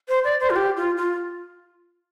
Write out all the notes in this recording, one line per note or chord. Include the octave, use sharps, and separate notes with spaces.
C5
D5
C5
F4
G4
F4
F4